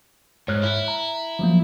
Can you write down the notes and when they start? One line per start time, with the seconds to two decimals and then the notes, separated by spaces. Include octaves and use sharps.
0.48 G#2 C#5 F6 F#6
0.63 E4
0.88 A#5
1.39 F3 F#3 A#3